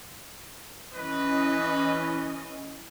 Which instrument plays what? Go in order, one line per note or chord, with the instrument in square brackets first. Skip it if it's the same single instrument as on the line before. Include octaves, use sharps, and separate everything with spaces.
[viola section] E3 C#4 D#5 [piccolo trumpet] B4